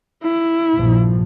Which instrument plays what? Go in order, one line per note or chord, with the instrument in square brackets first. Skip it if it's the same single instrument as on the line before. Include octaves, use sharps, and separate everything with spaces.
[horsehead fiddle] E4
[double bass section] A#1 G2 F3